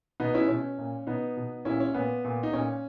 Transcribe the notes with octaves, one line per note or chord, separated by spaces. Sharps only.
B2 B3 D#4
C#4 E4
B2 C#4
A#2
B2 B3 D#4
B2
A#2 C#4 E4
C#4
A#2 B3
A#2
D#4
A#2 C#4